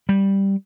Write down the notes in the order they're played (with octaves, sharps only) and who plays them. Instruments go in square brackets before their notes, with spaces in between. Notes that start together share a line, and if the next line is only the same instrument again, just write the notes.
[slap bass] G3